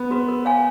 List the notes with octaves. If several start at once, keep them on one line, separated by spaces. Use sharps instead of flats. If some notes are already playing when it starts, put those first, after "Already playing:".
Already playing: B3
F#4 B4
A#4
C#5 F5 G#5